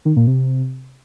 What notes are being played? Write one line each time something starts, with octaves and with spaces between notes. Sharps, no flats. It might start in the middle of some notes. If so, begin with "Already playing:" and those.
D#3
A#2
C3